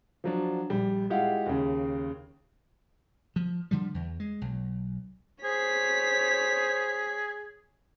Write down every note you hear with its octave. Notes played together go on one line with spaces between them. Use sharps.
F3 F#3 D4
A#1 G3
G#3 E4 F4 G4 F5 F#5
D#2 C#3
F3
D3 F3 G3
E2
G#3
B1
G#4 C5 C#5 B6